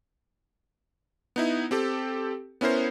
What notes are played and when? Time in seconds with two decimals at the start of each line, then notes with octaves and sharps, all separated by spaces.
1.36 B3 D#4 E4
1.71 C4 G4 A4
2.61 B3 C#4 E4 A#4 C5